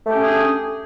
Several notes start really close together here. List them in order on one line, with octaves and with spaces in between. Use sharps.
A3 G4 C#4 G#4 D4